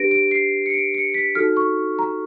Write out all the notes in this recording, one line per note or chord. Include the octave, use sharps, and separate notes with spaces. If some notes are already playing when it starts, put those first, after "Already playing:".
Already playing: D4 G4 B4 A#6 D7
D7
C7
C#7
D7
C#7
B6
D#4 F#4 A4 F6
C#6
A#5